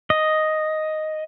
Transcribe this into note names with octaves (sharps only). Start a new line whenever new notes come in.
D#5